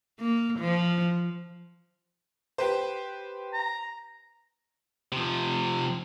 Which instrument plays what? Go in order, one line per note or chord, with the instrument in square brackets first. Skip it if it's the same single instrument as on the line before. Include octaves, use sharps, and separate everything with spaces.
[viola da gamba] A#3
F3
[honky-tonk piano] G4 B4 C5
[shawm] A#5
[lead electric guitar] C3 F3